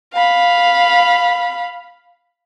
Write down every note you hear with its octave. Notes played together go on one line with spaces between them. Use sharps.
F5 B5